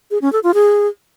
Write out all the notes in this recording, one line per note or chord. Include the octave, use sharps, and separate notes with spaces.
G#4
C#4
A4
F4
G#4